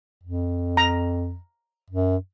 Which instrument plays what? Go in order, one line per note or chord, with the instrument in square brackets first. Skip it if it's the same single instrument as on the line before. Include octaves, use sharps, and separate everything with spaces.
[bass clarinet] F2
[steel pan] A#5
[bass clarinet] F#2